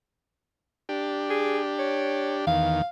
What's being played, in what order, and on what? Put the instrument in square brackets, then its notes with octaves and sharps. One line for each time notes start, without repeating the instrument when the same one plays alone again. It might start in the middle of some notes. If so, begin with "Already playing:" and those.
[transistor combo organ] D4 G4
[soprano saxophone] G#4
C#5
[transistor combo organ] E2 D#3 [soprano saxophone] F5